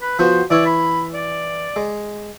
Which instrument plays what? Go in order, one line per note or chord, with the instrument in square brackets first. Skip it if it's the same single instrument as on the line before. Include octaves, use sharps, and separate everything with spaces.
[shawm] B4
[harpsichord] F3 B3 F#4 [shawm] C5
[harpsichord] E3 E4 C#5 [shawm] D5
[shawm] B5
D5
[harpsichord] G#3